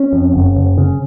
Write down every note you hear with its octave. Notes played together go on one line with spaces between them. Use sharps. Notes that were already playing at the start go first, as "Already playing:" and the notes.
Already playing: C#4
F2
F#1
F#1
C#3